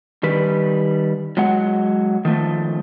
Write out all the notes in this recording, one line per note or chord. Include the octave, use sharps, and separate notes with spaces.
D#3 G3 B4
F#3 G#3 F#5
D#3 F3 A3